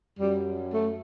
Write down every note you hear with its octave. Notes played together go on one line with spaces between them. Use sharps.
F#2 F#3 G3
A3